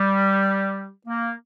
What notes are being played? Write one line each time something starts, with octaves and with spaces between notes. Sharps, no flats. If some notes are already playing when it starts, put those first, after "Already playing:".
Already playing: G3
A#3